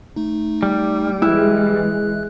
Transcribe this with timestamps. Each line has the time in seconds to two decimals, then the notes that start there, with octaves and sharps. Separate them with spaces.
0.16 A3 D#4
0.63 G3
1.22 E3 G#3 E4 F#6